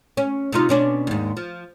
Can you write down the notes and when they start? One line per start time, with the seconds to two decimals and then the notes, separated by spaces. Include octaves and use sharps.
0.17 C#4
0.52 C3 D#4 F4
0.69 B2 C#4 D4
1.07 D#2 G#2
1.37 F3